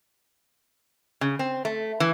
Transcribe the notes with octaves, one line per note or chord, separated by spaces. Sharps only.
C#3
C4
A3
E3